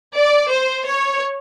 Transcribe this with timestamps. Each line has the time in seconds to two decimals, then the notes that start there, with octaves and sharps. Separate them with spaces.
0.15 D5
0.51 C5
0.87 C#5